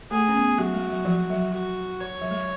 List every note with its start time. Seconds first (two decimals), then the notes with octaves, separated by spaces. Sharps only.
0.11 A3 G#4
0.28 C#4
0.35 B3
0.58 F#3 F#4
0.74 G#3
0.90 F#3
1.05 F3
1.30 F#3
1.53 F#4
2.00 C#5
2.21 F#3
2.31 G#3